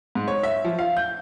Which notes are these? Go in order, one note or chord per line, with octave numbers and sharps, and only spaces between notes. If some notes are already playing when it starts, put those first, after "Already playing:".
G#2
C#5
E5
F3
F5
G6